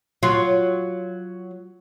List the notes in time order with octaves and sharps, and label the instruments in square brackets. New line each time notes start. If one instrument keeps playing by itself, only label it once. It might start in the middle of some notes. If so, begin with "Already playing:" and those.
[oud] F#3 F4